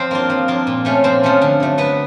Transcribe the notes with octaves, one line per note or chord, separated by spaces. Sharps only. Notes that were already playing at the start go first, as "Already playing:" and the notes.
Already playing: F3 C4 C5
A#3 D4 F4
F3
A#3 D4 F4
A#2
F3 A3 C#4
A#2 C4 C5
F3 A3 C#4
D3
F#3 A3
D3 B3 B4